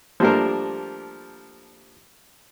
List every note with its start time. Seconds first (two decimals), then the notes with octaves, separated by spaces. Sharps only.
0.20 F3 G3 A3 A#3 D4 A#4